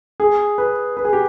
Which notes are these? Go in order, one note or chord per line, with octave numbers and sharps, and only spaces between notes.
G#4
B4
B4
G#4
G4